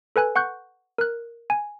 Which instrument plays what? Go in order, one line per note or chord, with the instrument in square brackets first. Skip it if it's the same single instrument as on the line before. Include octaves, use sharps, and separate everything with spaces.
[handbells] A4 B4 G#5 F#6
F#5 C#6 F#6 G6
A#4 F#6
G#5